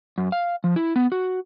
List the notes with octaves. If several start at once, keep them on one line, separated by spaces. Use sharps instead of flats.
F#2
F5
F3
E4
B3
F#4